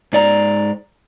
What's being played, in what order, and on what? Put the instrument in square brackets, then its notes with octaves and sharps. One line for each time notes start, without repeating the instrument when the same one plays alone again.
[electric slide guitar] G#2 D5 A#5